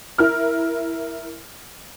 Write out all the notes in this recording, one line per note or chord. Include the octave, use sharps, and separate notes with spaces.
E4 A#4 F6